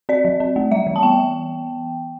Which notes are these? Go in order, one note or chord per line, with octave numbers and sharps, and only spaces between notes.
C4 D5
F#3
C4
A3
G3 E5
E3
A5
B3 G5